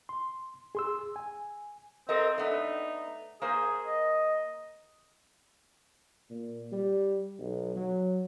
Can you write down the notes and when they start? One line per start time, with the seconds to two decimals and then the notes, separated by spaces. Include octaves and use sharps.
0.09 C6
0.75 G#4 C6 E6
1.16 G#5
2.09 C4 A4 A#4 D#5
2.38 A3 B3 D4 D#4
3.42 A#3 G#4 A#4 C5
3.86 D#5
6.30 A#2
6.72 G3
7.39 B1
7.76 F#3